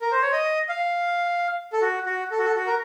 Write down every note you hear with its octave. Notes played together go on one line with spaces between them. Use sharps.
A#4
C5
C#5
D#5
F5
A4
F#4
F#4
A4
F#4
A4
F#4
A#4